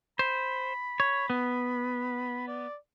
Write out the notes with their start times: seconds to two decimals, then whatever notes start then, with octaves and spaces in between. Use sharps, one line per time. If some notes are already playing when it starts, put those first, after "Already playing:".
0.19 C5 B5
1.00 C#5
1.30 B3
2.48 D5